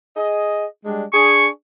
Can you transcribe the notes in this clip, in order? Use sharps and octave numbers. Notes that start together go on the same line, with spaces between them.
G#4 D#5
G3 G#3 D4
D4 G#4 C#6